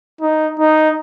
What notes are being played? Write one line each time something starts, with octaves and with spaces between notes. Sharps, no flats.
D#4
D#4